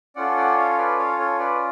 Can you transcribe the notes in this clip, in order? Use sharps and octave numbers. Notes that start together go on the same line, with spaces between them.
C#4 F4 A4 D5 F#5
D5 F#5
C#5 F5
F5
B4 D5
C#5 F5
A4 C#5
B4 D5